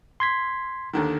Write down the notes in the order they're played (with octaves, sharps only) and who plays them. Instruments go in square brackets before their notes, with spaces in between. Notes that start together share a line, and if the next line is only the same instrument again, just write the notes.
[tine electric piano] C6 G#6 B6
[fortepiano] D#2 D3 D#3